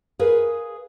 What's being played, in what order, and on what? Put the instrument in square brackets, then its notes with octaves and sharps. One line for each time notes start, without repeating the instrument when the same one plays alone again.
[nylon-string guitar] G#4 A#4 B4 F5